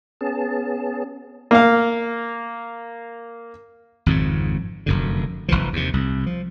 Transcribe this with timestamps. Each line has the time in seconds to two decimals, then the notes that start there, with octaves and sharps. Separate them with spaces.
0.21 B3 C#4 G#4 A5
1.51 A#3 F5
4.06 G#1 F2 G#2 C#3
4.86 F1 F#2 D3
5.49 F1 B1 E3 F3
5.73 D#2 C3
5.93 C2
6.26 F3